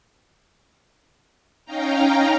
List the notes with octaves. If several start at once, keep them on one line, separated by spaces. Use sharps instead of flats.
C#4 D#4 F5 G5 A#5